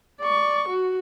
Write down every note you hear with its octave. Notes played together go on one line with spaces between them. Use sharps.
D5 C#6
F#4